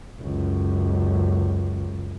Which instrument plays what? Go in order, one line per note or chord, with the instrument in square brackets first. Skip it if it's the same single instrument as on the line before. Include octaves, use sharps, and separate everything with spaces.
[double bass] C#2 F#2